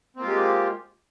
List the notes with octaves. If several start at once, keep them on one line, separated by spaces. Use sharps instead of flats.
G#3 A#3 C4 F4 G4